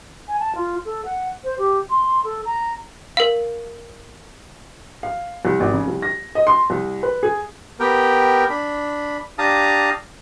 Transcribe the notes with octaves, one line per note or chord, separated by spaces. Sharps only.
G#5
A5
F4
A4
F#5
C5
G4
C6
A4
A#5
A#4 F5
F5
C2
G#1
C#3
C2
A#6
D#5
C6
C2
B4
G#4
B3 G4 A#4 G5
D4 B5
D4 G4 F5 A5 A#5 D#6